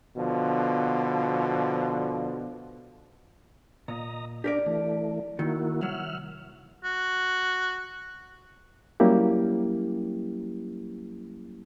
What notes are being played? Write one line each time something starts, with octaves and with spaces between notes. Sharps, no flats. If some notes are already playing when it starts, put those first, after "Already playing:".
B2 D3 F3
A#2 D#5 A#5
D4 G4 A#4 D5
E3 A3
D#3 A#3 E4 F#4
C2 F#3 E5 F#5 F6
F#4
F#3 G3 A#3 C#4 E4 G4